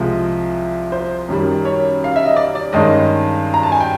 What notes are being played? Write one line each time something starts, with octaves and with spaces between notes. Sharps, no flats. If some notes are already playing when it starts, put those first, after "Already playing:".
Already playing: C2 C3 F3 G#3
C5
F#2 D#3 G3
C#5
F5
E5
D#5
D5
D5
G2 D#3 G#3 C#4 D#5
A#5
A5
G#5
G5